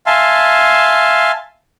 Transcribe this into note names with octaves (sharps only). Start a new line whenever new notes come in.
E5 F5 G#5 A5 C6